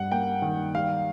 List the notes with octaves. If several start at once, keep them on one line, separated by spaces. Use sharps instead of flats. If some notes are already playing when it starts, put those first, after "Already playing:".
Already playing: G2 G3 F#5
A#3 G5
D#3
G3 F5